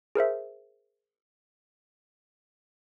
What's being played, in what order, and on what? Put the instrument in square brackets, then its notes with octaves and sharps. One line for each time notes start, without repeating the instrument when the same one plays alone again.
[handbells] G#4 A#4 C5 E5